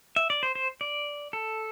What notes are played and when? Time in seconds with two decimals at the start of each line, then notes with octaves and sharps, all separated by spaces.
0.16 E5
0.30 D5
0.43 C5
0.55 C5
0.81 D5
1.33 A4